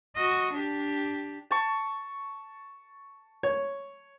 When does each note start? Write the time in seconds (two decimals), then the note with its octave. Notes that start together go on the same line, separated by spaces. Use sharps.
0.15 F#4 D#5
0.53 D4 G4
1.51 A5 C#6
3.43 C#5